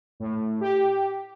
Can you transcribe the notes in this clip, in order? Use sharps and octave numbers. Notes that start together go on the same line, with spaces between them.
A2
G4